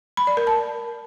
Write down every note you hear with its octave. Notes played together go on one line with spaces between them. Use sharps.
B5
D5
A#4
A5